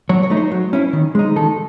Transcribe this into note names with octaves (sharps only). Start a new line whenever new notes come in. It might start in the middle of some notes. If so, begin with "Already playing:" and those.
F#3 C#5
C#5
A3 D#4
C5
F#3
C#4 E4
D#3
G#3 D#4
D#3 A4